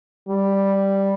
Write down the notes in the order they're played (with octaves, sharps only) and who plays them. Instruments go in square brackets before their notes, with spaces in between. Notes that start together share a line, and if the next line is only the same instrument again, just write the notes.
[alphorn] G3